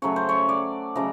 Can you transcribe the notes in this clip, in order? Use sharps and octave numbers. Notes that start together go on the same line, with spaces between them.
C#3 F#3 A3 C#5
C5
C#5
D5
C#3 F#3 A3 D#5